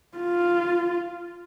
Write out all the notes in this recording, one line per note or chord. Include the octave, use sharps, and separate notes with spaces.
F4